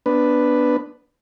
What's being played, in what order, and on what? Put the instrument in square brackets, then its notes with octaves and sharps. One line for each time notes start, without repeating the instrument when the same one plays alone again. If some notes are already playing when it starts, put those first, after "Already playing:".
[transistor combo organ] B3 D4 B4